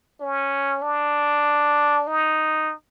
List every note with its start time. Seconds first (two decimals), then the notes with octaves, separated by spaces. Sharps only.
0.21 C#4
0.82 D4
2.07 D#4